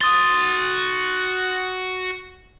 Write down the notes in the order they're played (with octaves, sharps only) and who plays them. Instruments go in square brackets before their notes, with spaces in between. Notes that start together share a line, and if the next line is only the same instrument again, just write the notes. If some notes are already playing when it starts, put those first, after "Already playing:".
[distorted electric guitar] F#4 C6 [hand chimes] D#6 A6